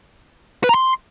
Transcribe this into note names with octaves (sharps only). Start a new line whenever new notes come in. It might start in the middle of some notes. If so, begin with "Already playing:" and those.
B4
A#5
C6